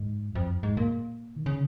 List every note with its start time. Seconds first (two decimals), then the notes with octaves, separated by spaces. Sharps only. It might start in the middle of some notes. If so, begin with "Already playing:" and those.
Already playing: G#2
0.30 F#2
0.35 F2
0.63 G#2
0.77 A#2
1.36 D#3
1.46 C#3